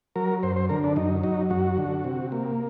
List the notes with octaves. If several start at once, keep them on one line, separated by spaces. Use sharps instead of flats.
F#3 A#4
F#2 C5
C5
D3 A#4
D4
F#2 D#4
F#3 D#4
F#2 F#4
D3
C3
A#3